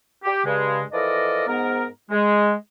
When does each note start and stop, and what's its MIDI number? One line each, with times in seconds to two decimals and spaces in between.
0.24 0.41 67
0.45 0.81 43
0.45 0.81 49
0.45 0.81 56
0.92 1.44 52
0.92 1.44 53
0.92 1.44 69
0.92 1.44 70
0.92 1.44 74
0.92 1.44 75
1.47 1.86 44
1.47 1.86 59
1.47 1.86 70
2.11 2.53 56